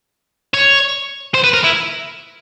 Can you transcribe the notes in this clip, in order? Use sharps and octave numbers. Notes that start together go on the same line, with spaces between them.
C#5
C5
B4
A#4
E4